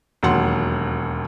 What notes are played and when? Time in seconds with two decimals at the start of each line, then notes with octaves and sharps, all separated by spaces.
0.23 E1 D#2 F#3 F#5 C6